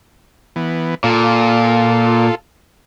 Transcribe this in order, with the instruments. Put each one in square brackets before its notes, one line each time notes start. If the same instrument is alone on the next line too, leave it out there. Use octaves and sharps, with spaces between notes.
[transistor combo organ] E3 B3
[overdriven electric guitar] A#2 [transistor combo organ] F4 A4